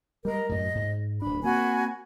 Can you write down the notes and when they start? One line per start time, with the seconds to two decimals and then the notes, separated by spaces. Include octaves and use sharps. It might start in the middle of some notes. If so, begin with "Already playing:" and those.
0.25 G3 G#3 A#4 D#5
0.49 F#2 A2 D#5
0.75 G#2
1.22 D1 D4 B5
1.44 A#3 C4 F#4 G#5 B5